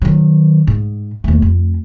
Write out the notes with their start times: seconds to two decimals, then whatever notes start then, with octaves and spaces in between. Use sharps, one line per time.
0.02 D#3 F#3
0.67 G#2
1.24 D#2 A3
1.42 F2